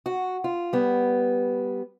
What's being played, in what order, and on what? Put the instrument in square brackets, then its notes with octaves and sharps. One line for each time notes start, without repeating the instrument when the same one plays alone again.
[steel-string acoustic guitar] F#4
F4
G3 B3